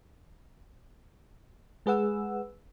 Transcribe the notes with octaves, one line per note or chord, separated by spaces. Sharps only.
G#3 G#4 B4 F#5 E6